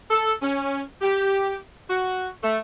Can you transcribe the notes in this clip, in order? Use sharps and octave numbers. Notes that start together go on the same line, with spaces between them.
A4
C#4
G4
F#4
A3